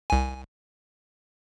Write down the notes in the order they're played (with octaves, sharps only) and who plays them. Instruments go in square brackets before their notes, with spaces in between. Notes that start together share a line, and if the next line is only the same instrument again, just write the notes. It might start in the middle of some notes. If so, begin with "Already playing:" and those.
[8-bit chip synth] C2 G#5